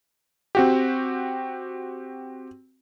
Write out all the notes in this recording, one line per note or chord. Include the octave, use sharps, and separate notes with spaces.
C4 F#4 G4